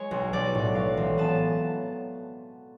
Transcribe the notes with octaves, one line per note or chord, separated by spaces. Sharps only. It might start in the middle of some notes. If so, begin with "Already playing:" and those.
Already playing: G#3 C#5
B1
B1 D5
A2
F#3 F5
A1
B3 A5